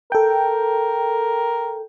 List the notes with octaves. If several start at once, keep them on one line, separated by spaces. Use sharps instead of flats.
A4 A#4 G5